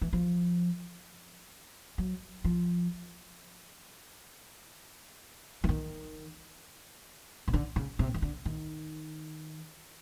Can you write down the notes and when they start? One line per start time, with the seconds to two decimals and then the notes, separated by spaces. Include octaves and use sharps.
0.02 E3
0.13 F3
1.98 F#3
2.44 F3
5.64 E3
5.69 D#3
7.48 C#3
7.54 D3
7.76 C#3
7.99 C3
8.14 D#3
8.22 D3
8.45 D#3